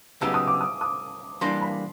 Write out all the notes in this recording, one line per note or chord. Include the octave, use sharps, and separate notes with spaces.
C#3 F#3 B3 D#4 G4 E6
D#6
D6
D#6
D#6
E3 G3 A#3 D4 C6
B5